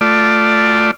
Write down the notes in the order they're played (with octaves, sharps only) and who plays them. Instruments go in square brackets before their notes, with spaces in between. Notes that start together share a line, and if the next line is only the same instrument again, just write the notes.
[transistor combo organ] A3 F4 D5